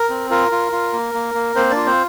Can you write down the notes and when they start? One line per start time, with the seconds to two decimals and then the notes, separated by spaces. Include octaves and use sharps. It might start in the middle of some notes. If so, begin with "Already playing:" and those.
Already playing: A#4
0.10 C4
0.30 F4 A#4
0.52 F4
0.72 F4
0.93 A#3
1.14 A#3
1.35 A#3
1.55 A#3 C4 C5
1.70 D4 D5
1.76 F4
1.86 C4 C5